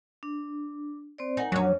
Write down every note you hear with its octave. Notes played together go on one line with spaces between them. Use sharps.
D4
C4 C5 D5
D#4 A#4 F#5 G#5
F2 F#3 C#4 D4